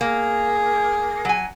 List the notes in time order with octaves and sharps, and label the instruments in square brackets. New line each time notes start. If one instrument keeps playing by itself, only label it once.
[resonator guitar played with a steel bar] A#3 [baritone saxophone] G#4
[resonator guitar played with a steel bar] F#3 G#5